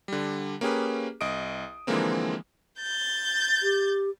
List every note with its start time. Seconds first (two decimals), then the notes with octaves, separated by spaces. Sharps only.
0.08 D3 G3
0.61 A#3 C#4 G4 G#4 B4
1.21 C2 D#5 D#6 D7
1.87 D3 E3 F3 G#3 A#3 C4
2.80 G6 A6
3.63 G4